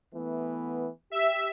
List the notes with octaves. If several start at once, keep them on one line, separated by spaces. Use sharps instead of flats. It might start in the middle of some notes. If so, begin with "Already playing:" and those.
E3 A3 B3
G4 E5